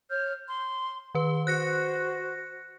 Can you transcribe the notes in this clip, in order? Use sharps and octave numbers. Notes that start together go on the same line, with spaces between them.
C#5 F6 G6
C6
D#3 B4 C6
F#4 C5 F#6 A#6 C#7